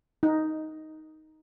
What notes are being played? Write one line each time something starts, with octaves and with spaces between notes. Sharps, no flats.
D#4